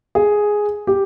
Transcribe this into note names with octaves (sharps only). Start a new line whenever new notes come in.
G#4
G4